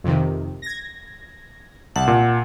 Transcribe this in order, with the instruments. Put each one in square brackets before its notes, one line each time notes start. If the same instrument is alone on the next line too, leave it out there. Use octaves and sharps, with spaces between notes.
[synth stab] F2 C3 D#3
G#6 A#6
[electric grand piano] C2 [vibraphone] F#5 [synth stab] A5
[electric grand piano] A#2